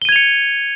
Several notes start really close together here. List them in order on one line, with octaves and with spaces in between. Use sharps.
G7 D#7 G#6 F7 C#7